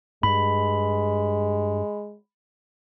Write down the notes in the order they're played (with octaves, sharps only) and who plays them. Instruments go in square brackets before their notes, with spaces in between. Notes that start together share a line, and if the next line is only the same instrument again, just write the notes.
[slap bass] G2 [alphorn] G#3 [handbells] B5